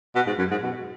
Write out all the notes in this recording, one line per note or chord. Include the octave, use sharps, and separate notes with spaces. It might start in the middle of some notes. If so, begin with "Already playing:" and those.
B2
G#2
F#2
G#2
B2